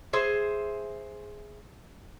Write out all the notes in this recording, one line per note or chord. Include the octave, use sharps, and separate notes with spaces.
G#4 C5 E5